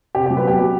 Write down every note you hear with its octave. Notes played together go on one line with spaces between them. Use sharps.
C3 G4
F#3 G4
B4
B3 G4
F#3